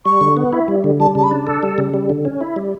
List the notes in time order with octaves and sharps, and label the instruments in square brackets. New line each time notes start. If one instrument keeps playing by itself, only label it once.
[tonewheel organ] G3 [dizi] C#6
[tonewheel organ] D3
B3
E4
G3
D3
[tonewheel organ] G3 [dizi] A5
[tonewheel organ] C#3 [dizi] A5
[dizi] B5
[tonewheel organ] D4
A4
G3
C#3
G3
D3
C#4
E4
G3